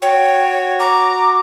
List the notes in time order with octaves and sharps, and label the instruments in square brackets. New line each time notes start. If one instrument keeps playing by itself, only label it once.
[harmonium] F#4 [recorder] C#5 [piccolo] G5
[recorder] A#5 [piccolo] D6